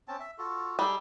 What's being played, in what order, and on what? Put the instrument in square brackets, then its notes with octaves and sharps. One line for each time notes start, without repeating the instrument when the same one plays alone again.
[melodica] C4 C#4 A5
E5
F4 F#4 A4
[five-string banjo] G3 [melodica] D#4 G#4 A4